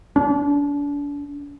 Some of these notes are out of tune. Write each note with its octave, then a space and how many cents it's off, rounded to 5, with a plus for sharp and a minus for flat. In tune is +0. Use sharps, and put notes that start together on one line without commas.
D4 -35